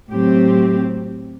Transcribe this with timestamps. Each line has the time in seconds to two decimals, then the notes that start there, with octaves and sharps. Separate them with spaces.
0.10 A2 F#3 C4 G4